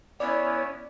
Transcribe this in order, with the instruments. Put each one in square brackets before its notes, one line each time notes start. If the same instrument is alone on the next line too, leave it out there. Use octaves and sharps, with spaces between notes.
[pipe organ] B3 C#4 E4 [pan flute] C#5 [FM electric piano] D5